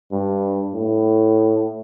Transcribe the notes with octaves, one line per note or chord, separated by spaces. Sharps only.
G2
A2